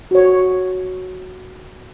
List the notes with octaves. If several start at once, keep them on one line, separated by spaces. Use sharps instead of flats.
F#4 C#5